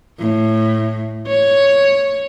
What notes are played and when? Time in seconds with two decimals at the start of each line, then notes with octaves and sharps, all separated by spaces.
0.19 A2
1.28 C#5